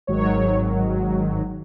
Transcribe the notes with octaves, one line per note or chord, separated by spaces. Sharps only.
G#1 G#2 D#3 F#3 C#5